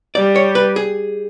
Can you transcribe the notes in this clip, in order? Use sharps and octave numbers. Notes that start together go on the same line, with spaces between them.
G3 D5
C#5
B4
G#4